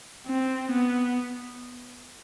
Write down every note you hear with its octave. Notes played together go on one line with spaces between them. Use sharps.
C4
B3